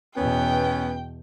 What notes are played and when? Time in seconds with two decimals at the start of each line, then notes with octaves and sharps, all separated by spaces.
0.17 E2 B2 B3 C#4 G5